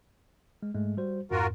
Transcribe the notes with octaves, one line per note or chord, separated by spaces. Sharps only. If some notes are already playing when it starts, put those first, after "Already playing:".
G#3
G#2 G#3 A3
G3 F#4 C5
F2 G#2 F4 F#4 A#4